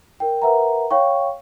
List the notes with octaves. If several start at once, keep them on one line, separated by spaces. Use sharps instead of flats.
A#4 G5
A#4 B4 E5 F#5 A#5
C#5 F5 G5 C#6